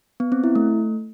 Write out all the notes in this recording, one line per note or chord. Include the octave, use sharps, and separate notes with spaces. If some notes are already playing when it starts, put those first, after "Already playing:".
B3
C4
E4
A3